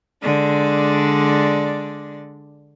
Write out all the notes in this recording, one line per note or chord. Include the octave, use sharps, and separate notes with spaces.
D3 G#3 D4 D5